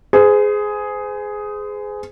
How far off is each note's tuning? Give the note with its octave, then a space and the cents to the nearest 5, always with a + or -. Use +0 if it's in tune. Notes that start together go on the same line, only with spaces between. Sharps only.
G#4 +5 C5 -40